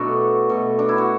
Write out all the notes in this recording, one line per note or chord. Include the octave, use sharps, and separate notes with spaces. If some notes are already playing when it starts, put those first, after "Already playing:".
Already playing: B2 F#3 A3 D4 E4 F#4
B2 A3
D4
E4
F#4